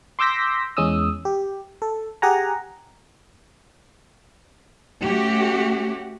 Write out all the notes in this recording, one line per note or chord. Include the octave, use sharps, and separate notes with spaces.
C6 D6 E6 G6 A#6 B6
E2 G#3 C#4 D#6 E6
G4
A4
G4 G#4 F#5 G#5 A#5
A3 C#4 F#4 G4